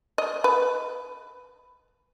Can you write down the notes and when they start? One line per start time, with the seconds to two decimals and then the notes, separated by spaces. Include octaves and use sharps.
0.18 D#5
0.44 B4